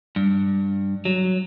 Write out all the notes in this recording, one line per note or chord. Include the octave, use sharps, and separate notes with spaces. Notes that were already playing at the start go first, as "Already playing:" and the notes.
G2
F#3